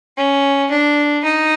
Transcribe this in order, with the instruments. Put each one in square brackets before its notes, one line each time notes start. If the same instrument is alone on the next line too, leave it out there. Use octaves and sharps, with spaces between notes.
[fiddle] C#4
D4
D#4